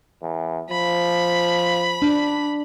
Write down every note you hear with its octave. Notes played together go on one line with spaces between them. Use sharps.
E2
F3 B5
D4